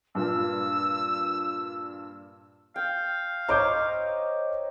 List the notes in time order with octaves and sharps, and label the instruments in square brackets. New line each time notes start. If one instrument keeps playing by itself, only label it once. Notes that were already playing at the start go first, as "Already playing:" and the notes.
[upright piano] G2 A#2 [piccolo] E6
[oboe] F5 [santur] G5
[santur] D#4 C5 C#5 [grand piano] D#5 D6 G6